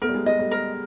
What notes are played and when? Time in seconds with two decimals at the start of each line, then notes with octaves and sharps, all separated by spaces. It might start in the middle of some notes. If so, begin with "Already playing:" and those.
0.02 A3 B3 A#4
0.09 G3
0.14 G#3
0.26 G#3 D#5
0.39 G3 A3
0.51 A#4